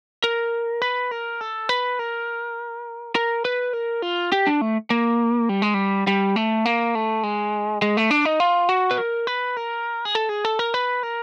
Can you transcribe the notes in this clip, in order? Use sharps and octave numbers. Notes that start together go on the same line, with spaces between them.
A#4
B4
A#4
A4
B4
A#4
A#4
B4
A#4
F4
G4
D4
A3
A#3
G3
G#3
G3
G3
A3
A#3
A3
G#3
G#3
A3
D4
D#4
F4
F#4
B4
A#4
B4
A#4
G#4
A4
G#4
A4
A#4
B4
A#4